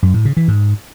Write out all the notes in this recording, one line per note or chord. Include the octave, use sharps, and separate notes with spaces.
F#2
A2
C#3
E3
G#2